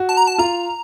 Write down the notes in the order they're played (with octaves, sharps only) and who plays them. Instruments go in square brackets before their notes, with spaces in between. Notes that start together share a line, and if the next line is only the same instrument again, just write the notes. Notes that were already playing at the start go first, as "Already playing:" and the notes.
Already playing: [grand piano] F#4
[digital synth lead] A5
A#5
A5
[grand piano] F4 [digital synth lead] A#5